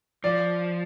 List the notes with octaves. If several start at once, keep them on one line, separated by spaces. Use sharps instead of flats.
F3 D5